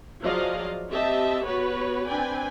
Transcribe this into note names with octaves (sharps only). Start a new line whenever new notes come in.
F3 F#3 G#4 D5 D#5 F5
C4 G4 D#5 E5 A5
B3 F#4 G4 B4 C#5
C4 D4 B4 D5 G5 G#5